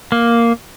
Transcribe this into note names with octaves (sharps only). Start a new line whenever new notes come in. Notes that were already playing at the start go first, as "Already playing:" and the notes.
A#3